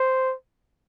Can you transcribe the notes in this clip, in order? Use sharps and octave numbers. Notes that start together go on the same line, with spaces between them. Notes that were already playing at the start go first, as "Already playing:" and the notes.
Already playing: C5